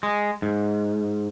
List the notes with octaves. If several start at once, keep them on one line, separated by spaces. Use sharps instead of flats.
G#3
G#2